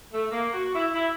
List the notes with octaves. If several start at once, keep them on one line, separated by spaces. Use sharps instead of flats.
A3
A#3
F#4
E4
E4